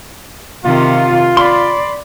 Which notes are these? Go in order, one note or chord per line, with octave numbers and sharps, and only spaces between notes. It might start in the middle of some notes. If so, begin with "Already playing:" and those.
C3 D#3 F4
D5 B5 C6